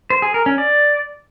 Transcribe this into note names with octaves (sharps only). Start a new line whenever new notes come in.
C5
G#4
A#4
C#4
D5